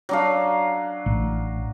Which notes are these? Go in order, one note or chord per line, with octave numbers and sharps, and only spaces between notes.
F#3 D4 F5
A1